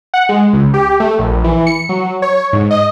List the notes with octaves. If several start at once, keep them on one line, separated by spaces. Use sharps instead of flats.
F#5
G#3
C#2
G4
A3
A#1
E3
C#7
F#3
C#5
G#2
D#5